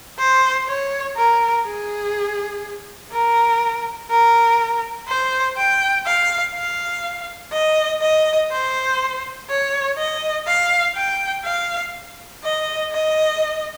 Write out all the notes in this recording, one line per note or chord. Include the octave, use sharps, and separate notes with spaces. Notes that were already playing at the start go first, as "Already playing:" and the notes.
C5
C#5
A#4
G#4
A#4
A#4
C5
G5
F5
F5
D#5
D#5
C5
C#5
D#5
F5
G5
F5
D#5
D#5